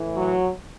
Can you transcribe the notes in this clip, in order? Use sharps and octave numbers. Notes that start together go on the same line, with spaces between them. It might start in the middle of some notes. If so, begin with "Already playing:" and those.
Already playing: A2 E3
F#3